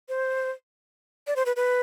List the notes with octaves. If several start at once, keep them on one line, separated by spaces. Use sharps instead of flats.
C5
D5
C5
B4
B4